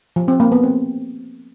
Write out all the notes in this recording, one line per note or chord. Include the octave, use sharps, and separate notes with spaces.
F3
C4
A#3
B3
C4